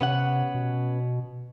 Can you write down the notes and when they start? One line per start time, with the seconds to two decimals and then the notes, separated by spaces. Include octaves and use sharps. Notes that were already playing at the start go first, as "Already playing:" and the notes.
0.01 C3 B3 C#4 F#5
0.54 B2